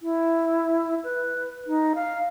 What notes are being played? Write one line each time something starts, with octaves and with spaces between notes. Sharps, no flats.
E4
B4
D#4
F5